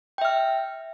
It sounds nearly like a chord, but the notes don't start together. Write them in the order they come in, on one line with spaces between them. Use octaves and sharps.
G5 E5 F6